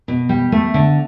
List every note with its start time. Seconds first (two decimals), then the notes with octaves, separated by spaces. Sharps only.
0.08 B2
0.29 G3
0.52 A3
0.74 D3